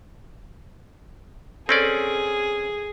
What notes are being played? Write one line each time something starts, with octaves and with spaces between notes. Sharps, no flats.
C4 C#4 G#4 A4 D5